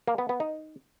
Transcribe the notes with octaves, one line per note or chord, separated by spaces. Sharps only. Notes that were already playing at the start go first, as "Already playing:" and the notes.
A#3
B3
B3
D#4